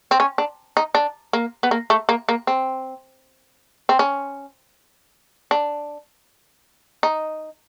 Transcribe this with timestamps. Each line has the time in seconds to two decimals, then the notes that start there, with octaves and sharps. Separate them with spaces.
0.11 C4
0.20 C#4
0.38 D4
0.77 D#4
0.95 D4
1.33 A#3
1.63 B3
1.71 A#3
1.90 A3
2.09 A#3
2.29 A#3
2.47 C4
3.89 C4
3.99 C#4
5.51 D4
7.03 D#4